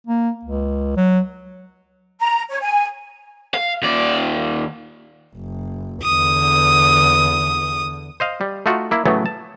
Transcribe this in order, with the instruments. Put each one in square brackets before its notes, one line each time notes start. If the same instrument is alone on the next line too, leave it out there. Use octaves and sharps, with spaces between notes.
[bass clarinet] A#3
C#2
F#3
[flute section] A#5
C#5
G#5
[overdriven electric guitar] F5
D#2 D5
[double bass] F#1
[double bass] E2 D3 [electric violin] D#6
[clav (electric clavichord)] C5 D#5 F5
G3
A3 D#4 F4 F#4
A#3 E4
A2 C#3 E3 F#3 A3 B3
A5